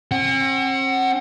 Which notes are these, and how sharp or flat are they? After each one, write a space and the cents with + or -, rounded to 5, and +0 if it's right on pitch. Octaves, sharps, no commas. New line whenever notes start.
C4 +45 F#5 +20